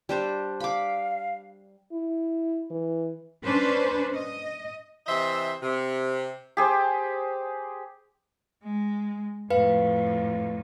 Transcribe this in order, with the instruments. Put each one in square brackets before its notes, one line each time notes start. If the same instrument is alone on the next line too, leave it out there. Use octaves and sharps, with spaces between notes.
[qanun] G3 D4 C5
[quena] F5 [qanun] B5 D6
[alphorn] E4
E3
[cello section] C#4 D4 B4 C5
D#5
[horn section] C3 E3 C5 D#5 E5
C3
[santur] G4 G#4 C5
[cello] G#3
[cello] F2 A2 [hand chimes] B4 F5